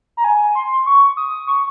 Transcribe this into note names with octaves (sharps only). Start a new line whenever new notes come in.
A#5
G#5
C6
C#6
D#6
C#6